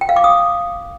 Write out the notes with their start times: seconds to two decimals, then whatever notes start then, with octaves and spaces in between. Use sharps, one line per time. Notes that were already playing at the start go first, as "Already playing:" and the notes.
0.01 G5
0.09 F5
0.16 D6
0.24 D#6